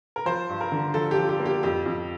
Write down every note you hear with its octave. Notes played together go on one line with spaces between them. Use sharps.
A#4
F3 C5
G2
A#4
D3
F3 A4
G4
F3
G4
A#3
G4
F2 G4
F2